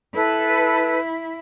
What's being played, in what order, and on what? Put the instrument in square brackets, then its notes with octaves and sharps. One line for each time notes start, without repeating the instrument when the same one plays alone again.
[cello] E4 [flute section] A4 B4